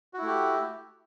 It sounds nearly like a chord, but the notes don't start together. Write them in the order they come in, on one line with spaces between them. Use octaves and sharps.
F#4 E4 A3 G4